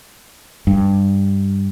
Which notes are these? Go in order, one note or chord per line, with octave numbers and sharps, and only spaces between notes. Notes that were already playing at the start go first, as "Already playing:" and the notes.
G2